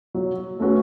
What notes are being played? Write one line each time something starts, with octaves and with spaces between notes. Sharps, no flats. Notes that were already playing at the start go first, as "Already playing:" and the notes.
F#3
A3 C#4 F#4 B4